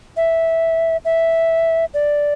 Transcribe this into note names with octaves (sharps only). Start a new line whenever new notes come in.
E5
E5
D5